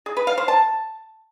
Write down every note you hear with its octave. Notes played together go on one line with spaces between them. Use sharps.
G#4
B4
F5
C5
A5